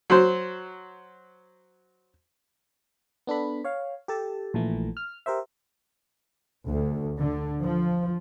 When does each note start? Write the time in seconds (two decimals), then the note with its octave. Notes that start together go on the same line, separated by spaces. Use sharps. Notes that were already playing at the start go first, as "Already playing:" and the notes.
0.10 F#3 C5
3.27 B3 D4 A4 B5
3.64 C#5 F5
4.08 G4 A4 A5
4.54 A#1 A#2 E3 A3
4.97 F6
5.26 G4 A#4 C5 E5
6.67 D2
7.18 D3
7.63 F3